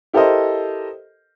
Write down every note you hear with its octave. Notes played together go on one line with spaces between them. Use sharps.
E4 G4 A4 A#4 C5 D#5